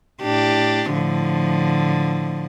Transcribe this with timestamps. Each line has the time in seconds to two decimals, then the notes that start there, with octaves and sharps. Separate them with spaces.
0.22 A2 D4 G4
0.94 A2 D3 F3